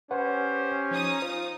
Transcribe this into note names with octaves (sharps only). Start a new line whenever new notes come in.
C#4 G4 B4 C5 F#5
F3 D#4 D#6
F4 C5